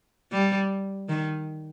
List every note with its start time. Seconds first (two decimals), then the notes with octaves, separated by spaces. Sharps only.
0.32 G3
1.09 D#3